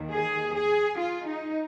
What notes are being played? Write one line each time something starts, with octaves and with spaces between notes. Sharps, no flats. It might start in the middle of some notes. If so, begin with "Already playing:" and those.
Already playing: D#2 D#3
G#4
G#4
F4
D#4